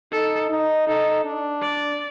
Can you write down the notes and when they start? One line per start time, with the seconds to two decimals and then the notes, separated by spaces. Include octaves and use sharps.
0.12 D#4 A4
0.50 D#4
0.87 D#4 A4
1.25 D4
1.62 D5